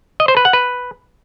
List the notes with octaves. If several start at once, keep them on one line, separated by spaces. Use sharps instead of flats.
D#5
C5
B4
F#5
B4